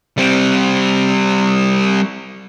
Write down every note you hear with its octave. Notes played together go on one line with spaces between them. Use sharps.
G3 C4